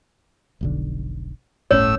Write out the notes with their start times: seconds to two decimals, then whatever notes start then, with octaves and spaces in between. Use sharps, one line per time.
0.61 F1 B1 D3
1.71 D1 G1 A2 C#4 C#5 E6